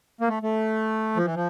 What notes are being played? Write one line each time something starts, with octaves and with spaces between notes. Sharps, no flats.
A#3
A3
A3
F3
E3
F3